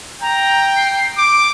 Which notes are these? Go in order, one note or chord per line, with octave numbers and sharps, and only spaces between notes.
G5 A#5
C7
D6 D7